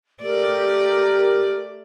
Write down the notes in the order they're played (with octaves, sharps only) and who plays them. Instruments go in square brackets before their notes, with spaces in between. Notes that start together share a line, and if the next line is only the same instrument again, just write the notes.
[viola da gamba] A3 D5 [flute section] G4 A#4